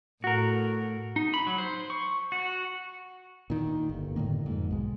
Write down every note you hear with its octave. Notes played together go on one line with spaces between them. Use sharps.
A2 F#4 A#4
D#4
B5
F#3
C5
C#6
F#4
A#2 D#3
G1
A2 D3 D#3 A#3
F2 G#2
B1 G#3